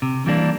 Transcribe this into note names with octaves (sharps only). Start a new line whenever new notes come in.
C3
E3 G3 A#3 D4